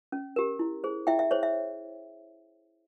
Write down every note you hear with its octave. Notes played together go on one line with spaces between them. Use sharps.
C#4
G4 A#4
E4
G#4 C5
E4 E5 G5
E5
G#4 C5 C#5
E5